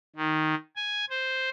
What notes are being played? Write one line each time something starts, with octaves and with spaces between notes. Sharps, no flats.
D#3
G#5
C5